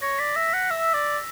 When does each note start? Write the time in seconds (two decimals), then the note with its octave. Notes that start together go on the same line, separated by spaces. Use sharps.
0.02 C#5 A#6
0.19 D5 B6
0.36 E5 A#6
0.48 B6
0.53 F#5 A#6
0.71 E5 E6
0.94 D5